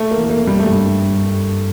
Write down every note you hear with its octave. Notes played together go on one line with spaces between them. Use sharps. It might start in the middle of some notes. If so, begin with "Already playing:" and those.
Already playing: A3
A#3
E2
A3
A#3
F2
G3
A3
G2 G3